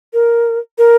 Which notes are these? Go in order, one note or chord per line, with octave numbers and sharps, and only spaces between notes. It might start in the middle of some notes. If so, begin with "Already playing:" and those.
A#4
A#4